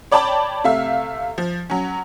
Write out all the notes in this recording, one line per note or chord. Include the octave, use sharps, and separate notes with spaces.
C#5 D5 G5 A5 B5 D6
C3 A3 E5 F5
F3
F#3 C#4